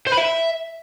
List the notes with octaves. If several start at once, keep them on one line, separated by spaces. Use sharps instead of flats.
C5
B5
E5